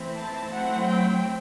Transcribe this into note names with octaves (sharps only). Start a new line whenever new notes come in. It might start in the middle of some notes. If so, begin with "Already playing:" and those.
Already playing: E3 A3 C4 E4
A5
F#3 A3 C4 E4 F#5
G5